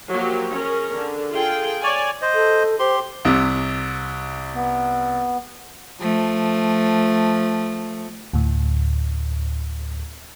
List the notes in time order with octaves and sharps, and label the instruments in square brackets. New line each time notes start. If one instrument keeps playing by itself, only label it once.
[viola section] F3 F#3 A#3 G4
C#4 G#4 A#4
D3
F4 G#4 A4 G5
C#5 D5 G#5
[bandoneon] C5 D#5
[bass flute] A4
[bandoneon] G4 C6 [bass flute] C5
[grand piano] C2 C3
[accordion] B3
[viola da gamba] F3 A3
[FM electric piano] D2 A2